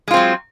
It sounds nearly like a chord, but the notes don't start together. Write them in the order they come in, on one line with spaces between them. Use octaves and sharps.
G#3 F4 C4 F#3